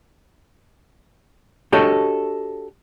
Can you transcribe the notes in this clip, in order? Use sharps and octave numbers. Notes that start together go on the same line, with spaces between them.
D4 F#4 G4 A4 C#5 D#5